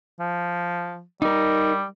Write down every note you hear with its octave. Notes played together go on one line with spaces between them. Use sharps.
F3
G3 D#4 A#4